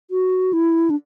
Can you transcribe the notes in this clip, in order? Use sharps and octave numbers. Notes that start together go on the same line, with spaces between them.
F#4
E4
D4